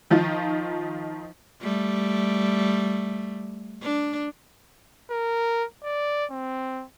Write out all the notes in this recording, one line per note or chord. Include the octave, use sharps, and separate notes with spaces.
D#3 F3 D#4 F4
G3 A3
D4
A#4
D5
C4